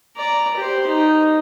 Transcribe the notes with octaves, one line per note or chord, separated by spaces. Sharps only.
D5 A#5
G4 C5
D#4